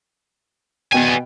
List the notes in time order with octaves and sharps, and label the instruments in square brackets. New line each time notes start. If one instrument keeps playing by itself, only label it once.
[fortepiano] B2 G5 [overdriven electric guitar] B3 G#5